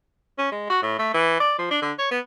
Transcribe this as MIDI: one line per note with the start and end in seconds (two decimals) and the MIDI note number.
0.38 0.51 61
0.52 0.65 56
0.70 0.81 66
0.82 0.95 45
0.99 1.14 57
1.14 1.39 52
1.40 1.54 74
1.59 1.68 53
1.71 1.80 62
1.82 1.92 50
1.98 2.08 73
2.11 2.19 59